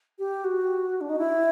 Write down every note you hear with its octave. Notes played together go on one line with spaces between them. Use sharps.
G4
F#4
D4
D#4
E4